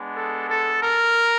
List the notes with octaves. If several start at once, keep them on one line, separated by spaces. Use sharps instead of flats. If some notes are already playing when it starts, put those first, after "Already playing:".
Already playing: G#3 B3 D4
A4
A4
A#4